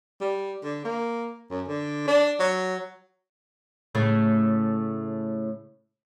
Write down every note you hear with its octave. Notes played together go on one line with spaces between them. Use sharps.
G3
D3
A#3
F#2
D3
D4
F#3
A2 C#3 A3